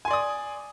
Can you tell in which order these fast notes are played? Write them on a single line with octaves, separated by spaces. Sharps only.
G#5 C6 D5 D#6